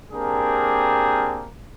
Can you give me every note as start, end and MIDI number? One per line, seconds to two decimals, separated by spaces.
0.12 1.47 58
0.12 1.47 60
0.12 1.47 62
0.12 1.47 67
0.12 1.47 68
0.12 1.47 70